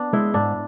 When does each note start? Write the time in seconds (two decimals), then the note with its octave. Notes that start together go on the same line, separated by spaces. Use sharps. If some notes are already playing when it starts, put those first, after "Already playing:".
Already playing: B3 D4
0.13 G#3 E4
0.34 G#2 D4